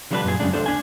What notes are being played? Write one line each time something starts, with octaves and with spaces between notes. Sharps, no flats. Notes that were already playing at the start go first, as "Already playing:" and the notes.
D3 F3 G3 D4 A4 B4
F#2 A#2 G#4
F#2 A2 C#3 G#3 D4
C#2 D4 A4 C5
D4 G#5